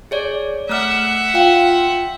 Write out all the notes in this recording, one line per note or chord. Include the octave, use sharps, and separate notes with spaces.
G#4 C#5 D5
A3 E5 F#5 F6
F4 F5 G5